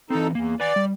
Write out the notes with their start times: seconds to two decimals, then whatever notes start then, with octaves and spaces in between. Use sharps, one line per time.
0.10 E3 C4 D#4 A4
0.35 E2 A#3
0.60 B4 D5 F#5 G#5
0.76 G3